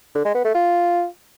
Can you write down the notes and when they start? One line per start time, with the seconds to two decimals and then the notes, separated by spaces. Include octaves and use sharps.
0.15 D3
0.25 G#3
0.35 B3
0.45 A3
0.55 F4